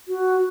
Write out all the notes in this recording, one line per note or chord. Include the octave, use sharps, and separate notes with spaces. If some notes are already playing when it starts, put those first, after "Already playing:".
F#4